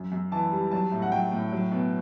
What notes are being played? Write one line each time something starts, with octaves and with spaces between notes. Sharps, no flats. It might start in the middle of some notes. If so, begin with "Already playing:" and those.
Already playing: F#2
F#2
E3 A5
G3
F#3 A5
A2
F#5
F#3 G5
A2
F#3
B2